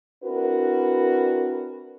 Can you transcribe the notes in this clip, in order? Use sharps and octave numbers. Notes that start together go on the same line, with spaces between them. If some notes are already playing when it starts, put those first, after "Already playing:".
C4 D4 E4 F#4 A#4 B4